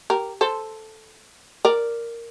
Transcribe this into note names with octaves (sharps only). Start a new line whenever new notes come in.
G4 A#4
A4 C5
A#4 D5